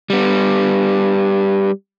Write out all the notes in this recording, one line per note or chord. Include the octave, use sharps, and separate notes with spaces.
G3 B3